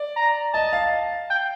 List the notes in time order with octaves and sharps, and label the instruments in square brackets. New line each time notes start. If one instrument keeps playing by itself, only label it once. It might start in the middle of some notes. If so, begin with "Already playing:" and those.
Already playing: [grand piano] D5
[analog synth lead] A#5
[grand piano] D#5 [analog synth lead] A5
[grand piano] F5
[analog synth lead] G5